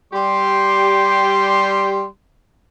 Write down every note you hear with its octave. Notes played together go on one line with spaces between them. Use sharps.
G3 G4 C6